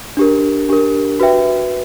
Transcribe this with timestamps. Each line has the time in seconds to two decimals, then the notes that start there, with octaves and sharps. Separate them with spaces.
0.17 D4 G4 A#4
0.69 D4 G4 A#4
1.20 F#4 B4 E5 G5